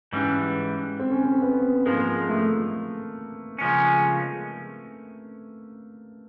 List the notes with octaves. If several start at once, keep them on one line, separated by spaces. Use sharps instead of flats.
G#2 E3 G3 C#4
C4
C#4
C4
B3
G#2 F3 G#3 A#3
A3
C#3 F3 G#3 C#4